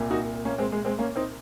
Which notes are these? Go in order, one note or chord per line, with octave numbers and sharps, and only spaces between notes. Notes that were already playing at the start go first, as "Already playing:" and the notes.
Already playing: C2 A#2
D#4 F#4
A#3 C#4
G#3 C4
G#3
G#3 C4
A#3 C#4
C4 D#4